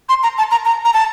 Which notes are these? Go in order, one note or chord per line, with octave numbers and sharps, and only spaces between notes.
C6
A#5
A5
A#5
A#5
A#5
A5